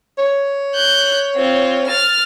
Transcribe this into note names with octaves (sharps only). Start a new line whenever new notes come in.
C#5
F#6 G6
C4 F4
F6 A6